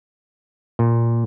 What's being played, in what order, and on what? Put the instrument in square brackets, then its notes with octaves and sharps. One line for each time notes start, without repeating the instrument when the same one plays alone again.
[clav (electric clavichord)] A#2